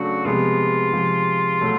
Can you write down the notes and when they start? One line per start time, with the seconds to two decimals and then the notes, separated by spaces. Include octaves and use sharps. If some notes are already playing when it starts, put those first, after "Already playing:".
Already playing: C#3 F#3 A3 D4 F#4
0.25 C3 F3 G#3 B3 F4
0.93 C3 F3 G#3
1.61 B2 F#3 A3